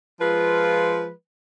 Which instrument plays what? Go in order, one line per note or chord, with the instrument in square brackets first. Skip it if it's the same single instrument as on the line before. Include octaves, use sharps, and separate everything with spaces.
[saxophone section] F3 G#3 F4 B4